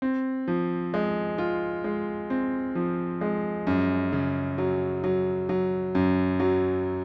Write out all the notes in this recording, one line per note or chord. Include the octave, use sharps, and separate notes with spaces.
C4
F3
G#3
F4
G#3
C4
F3
G#3
F#2
C#3
F#3
F#3
F#3
F#2
F#3